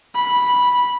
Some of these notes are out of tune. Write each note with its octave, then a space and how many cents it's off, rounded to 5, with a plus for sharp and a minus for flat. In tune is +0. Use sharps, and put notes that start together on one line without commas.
B5 -10